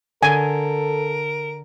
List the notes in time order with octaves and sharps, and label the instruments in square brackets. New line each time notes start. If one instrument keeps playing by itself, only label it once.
[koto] D3 [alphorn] A4 [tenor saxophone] A#4 [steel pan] G#5